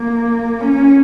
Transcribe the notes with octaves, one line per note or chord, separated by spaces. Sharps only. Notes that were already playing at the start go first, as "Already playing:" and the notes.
Already playing: A#3
C#4